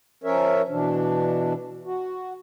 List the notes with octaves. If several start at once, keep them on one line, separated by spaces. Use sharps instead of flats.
F3 C#4 A#4 C#5 E5
B2 E3 D4
F#4